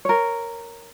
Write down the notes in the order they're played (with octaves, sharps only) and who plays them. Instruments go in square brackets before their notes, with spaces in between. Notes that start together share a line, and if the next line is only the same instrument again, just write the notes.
[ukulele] A#4 C#5